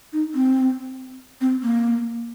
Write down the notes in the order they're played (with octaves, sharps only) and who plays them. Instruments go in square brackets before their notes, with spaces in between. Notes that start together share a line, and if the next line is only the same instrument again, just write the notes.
[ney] D#4
C4
C4
A#3